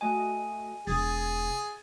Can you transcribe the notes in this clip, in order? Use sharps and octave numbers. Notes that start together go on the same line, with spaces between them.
A3 F#4 D#5 G#5
E1 G#4 D#6 G#6 A6 D#7